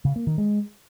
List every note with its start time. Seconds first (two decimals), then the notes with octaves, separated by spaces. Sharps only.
0.05 C#3
0.16 A#3
0.27 D#3
0.38 G#3